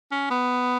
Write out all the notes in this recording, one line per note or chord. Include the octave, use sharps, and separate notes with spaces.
C#4
B3